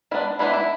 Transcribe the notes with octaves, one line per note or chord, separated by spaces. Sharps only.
G#3 B3 D4 E4
E3 G#3 B3 D4 E4
E4